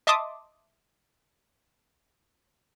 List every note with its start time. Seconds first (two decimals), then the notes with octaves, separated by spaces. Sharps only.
0.07 D#5 E5 A5 C6 D6 D#6